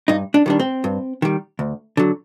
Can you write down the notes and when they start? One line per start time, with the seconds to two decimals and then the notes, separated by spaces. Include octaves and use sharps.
0.08 G2 D#4
0.34 D4
0.46 D#3 G3 D4
0.60 C4
0.84 G2
1.22 D#3 G3
1.59 D2
1.97 D3 F#3